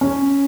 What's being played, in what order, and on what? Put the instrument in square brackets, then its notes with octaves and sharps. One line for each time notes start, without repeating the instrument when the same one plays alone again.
[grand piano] C#4